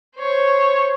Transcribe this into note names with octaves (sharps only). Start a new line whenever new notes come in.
C5 C#5